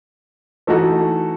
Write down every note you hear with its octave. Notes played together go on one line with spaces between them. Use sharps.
E3 A3 D#4 F#4 A4